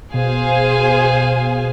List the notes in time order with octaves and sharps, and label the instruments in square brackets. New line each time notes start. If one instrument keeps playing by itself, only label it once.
[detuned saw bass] B2 [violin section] G#4 C5 F5 G#5